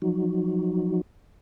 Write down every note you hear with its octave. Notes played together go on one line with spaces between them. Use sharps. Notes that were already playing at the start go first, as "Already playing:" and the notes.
F3 F#3 D#4 F#4